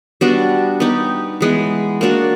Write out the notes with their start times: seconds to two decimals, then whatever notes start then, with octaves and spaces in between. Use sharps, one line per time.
0.21 G3 B3 D4 F#4
0.80 B3 D#4 G4
1.41 E3 G#3 B3
2.01 A#3 D4 F#4